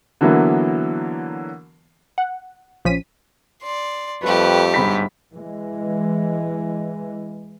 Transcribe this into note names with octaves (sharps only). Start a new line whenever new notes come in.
D3 E3 F#3 A#3 B3
F#5
A#1 F3 C#4 B6 D#7
D5 C6
F2 G3 A3 G4 B4
G1 G#2 B5 B6
E3 G#3